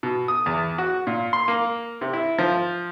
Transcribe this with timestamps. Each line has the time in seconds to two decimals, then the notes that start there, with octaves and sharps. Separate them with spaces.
0.03 B2
0.28 D#6
0.46 E2
0.78 F#4
1.07 A#2
1.33 C6
1.48 A#3
2.01 C3
2.13 E4
2.39 F3